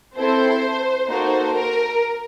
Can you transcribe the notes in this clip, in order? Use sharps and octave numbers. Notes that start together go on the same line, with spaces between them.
C4 E4 A4 C5
A#3 D#4 F#4 A4 C5
A#4